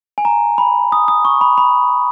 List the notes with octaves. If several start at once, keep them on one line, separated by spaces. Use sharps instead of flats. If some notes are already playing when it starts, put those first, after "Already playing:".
G#5
A#5
B5
D#6
D#6
C#6
B5
B5